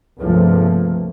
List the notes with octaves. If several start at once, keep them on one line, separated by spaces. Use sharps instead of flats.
C#2 G2 C3 F3 A3 A#3